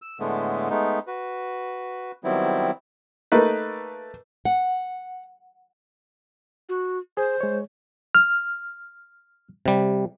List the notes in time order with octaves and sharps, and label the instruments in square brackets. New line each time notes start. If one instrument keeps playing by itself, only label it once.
[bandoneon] E6
A2 D3 G#3 A3 B3
G#3 A3 B3 D#4
F#4 B4
D#3 F#3 G3 B3 C4 E4
[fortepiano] A3 A#3 D#4 B4
[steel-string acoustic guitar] F#5
[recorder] F#4
[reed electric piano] G#4 [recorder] C5
[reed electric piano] G#3 C#5
F6
[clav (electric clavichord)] C3 G3